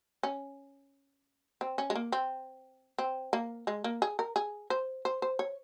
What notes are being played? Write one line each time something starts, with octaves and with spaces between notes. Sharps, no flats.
C#4
C4
C#4
G#3
A#3
C4
C4
A#3
G#3
A#3
G#4
A#4
G#4
C5
C5
C5
C#5